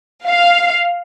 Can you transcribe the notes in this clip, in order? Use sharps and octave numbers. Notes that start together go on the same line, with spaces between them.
F5